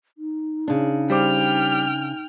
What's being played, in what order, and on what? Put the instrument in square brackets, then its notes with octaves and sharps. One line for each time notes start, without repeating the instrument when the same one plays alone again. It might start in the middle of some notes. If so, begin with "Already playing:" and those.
[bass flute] D#4
[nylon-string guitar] C#3 D4
[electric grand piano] G3 C5 D6 [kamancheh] G5 F6